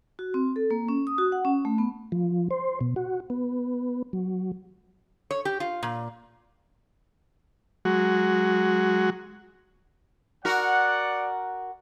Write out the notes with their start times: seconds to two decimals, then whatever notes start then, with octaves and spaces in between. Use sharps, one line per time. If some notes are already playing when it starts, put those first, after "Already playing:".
0.19 F#4
0.34 C4
0.56 A4
0.71 A#3
0.88 C#4
1.07 D#6
1.18 F#4
1.32 F#5
1.45 C#4
1.65 A3
1.78 B3
2.12 F3
2.51 C5
2.81 B2
2.96 F#4
3.30 B3
4.13 F#3
5.31 C#5
5.45 G4
5.60 F4
5.83 A#2
7.85 F#3 G#3 F#4
10.45 F#4 A#4 D5 F#5